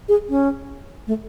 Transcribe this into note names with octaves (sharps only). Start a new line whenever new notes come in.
G#4
C#4
A3